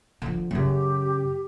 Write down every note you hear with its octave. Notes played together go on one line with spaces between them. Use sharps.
D3 F3
F#2 C#3 G4